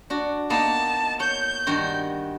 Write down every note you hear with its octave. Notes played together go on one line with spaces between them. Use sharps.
D4 F#4
A#3 B3 D#4 A5
C#5 G6
G2 D#3 F#4